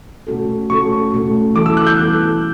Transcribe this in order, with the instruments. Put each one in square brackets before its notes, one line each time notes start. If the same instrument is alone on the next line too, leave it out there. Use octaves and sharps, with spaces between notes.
[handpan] B2 A3 C#4 F#4 A4
[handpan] B2 A3 C#4 F#4 A4 [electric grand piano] C#6
[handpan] B2 A3 C#4 F#4 A4
[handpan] E3 G3 B3 E4 A4 [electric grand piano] D6
[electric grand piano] E6
F#6
G6
[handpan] E3 G3 B3 E4 A4